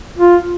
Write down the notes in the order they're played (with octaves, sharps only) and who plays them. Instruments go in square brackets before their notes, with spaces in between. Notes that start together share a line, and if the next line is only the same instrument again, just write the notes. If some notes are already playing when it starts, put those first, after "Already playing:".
[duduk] F4